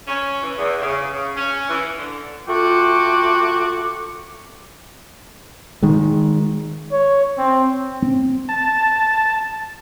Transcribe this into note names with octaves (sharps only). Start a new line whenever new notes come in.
C#4
E3
E2
C#3
C#3
C#4
E3
D3
A3 F4 F#4 G5 D6
D#3 G#3
C#5
C4
C4
A5